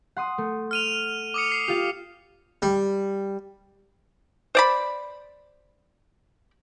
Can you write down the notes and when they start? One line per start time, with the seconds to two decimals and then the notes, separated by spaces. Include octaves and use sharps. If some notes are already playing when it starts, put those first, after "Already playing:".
0.17 F#5 C6 D#6
0.38 A3
0.71 F6 D#7 F7
1.34 D6 D#6 C#7
1.52 C7
1.68 F4 G4
2.62 G3
4.55 C5 D5 B5